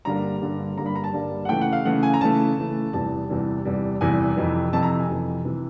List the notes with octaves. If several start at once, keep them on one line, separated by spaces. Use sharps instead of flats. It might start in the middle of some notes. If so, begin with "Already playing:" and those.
G2 D3 G3 A#3 A#5
G2 D3 G3 A#3
G2 D3 G3 A#3 A#5
B5
A#5
A5
G2 D3 G3 A#3
F#5
C#3 E3 A3 G5
F#5
F5
C#3 E3 A3 F#5
G#5
A#5
C#3 E3 A3 A5
C#3 E3 A3
E2 C3 E3 G3 A5
E2 C3 E3 G3
E2 C3 E3 G3
E2 C3 E3 G3 G#5
F2 C3 E3
F2 C3 E3 A5
A#5
G#5
F2 C3 E3
C3 E3